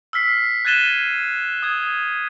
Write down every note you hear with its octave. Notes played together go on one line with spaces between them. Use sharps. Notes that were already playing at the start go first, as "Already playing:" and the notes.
E6 F6 B6 C7
F#6 G#6 A6 D#7 E7 G7
D#6 G#6